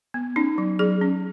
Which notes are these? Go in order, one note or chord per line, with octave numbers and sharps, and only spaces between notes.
B3
C#4 D#4
F#3
F#3 G#4
C#4